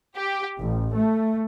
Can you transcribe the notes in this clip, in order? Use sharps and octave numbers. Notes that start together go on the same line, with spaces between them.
G4
A1
A3